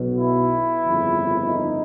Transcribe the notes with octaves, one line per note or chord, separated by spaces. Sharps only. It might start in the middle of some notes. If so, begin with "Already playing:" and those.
Already playing: B1 B2
E4
G1 F2 C#3
D#4